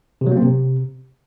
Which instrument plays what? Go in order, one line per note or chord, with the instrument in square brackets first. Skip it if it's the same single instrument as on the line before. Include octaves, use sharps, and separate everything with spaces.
[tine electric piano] C3
F#3
A#3
C4
C3